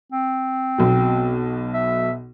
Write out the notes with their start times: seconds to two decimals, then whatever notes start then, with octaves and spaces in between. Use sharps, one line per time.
0.12 C4
0.78 B1 B2
1.74 E5